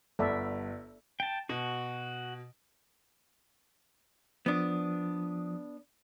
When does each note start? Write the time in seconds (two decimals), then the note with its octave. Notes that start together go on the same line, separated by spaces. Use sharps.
0.19 G1 A4 D5 E5
1.20 G5 A5
1.49 B2 F#4
4.46 F3 B3 D4 D#6